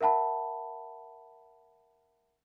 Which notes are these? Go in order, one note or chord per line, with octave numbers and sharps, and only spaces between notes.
A#4 E5 F#5 A5 B5